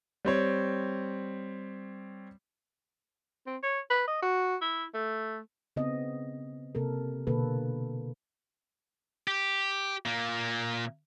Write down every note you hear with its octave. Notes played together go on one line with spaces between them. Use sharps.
G3 C4 C#5
C4
C#5
B4
D#5
F#4
E4
A3
C#3 B3 C4 D#5
C3 A#3 A4 A#4
B2 D3 A#3 A4 B4
G4
A#2 A#3